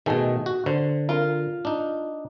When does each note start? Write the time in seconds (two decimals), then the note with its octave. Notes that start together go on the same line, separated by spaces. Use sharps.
0.06 B2 D#3 A3 G#4
0.46 F#4
0.66 D3 C5
1.09 F4 A#4
1.65 D4 D#4